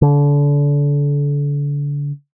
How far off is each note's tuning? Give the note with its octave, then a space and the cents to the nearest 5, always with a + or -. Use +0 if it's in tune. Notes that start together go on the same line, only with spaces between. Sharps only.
D3 -30